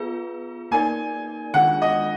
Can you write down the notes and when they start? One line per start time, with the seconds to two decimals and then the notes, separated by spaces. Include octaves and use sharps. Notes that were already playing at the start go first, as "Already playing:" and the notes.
Already playing: B3 F4 G#4 B4
0.71 A#3 D#4 A#4 D5 G#5
1.54 D#3 G#3 D4 F4 G#4 F#5
1.82 D#5